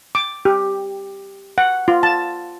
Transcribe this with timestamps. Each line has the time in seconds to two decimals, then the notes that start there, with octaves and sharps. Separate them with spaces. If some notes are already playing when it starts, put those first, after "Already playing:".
0.15 D6
0.45 G4
1.58 F#5
1.88 F4
2.03 A5